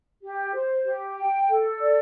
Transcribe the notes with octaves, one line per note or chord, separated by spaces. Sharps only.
G4
C5
G4
G5
A4
D5